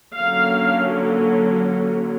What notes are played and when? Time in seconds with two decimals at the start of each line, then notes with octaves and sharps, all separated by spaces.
0.16 D3 F#3 A#3 C#4 F5